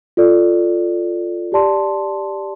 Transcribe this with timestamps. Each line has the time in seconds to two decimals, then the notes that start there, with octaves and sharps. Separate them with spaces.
0.17 F4 A4 D5
1.52 G4 D5 A5 C6